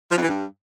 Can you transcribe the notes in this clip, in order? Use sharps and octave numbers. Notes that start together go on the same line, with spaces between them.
F3
F2
E3
G2